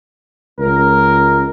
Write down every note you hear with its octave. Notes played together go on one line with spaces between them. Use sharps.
C#2 A#4